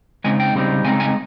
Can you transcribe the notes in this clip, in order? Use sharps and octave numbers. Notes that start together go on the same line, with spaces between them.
C#3 G#3 C4 D#4 G#5
G5
C#3 G3 C4 D#4
C#3 G#3 C4 D#4 G#5
G#5